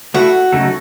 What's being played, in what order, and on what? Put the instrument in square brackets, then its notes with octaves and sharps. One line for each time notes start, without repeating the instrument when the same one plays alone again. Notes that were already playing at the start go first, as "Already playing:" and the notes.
[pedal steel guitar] A3 E4 A4 [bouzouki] F#4
[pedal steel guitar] C#3 F#3 A3 D#4 A4